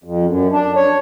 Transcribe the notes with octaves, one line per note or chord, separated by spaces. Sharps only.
F2
F#2
D4
C#5